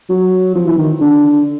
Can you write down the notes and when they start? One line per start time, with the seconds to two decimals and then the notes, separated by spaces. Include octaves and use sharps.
0.09 F#3
0.55 F3
0.66 E3
0.78 D#3
1.01 D3